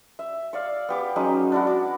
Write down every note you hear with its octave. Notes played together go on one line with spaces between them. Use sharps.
E5
C#5 D5 F5
B3 G4 D6
F#3 G#3 C#4 D#4
D4 E4 F#4
D6